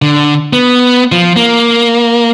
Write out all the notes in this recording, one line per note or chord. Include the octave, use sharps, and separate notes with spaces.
D3
B3
F3
A#3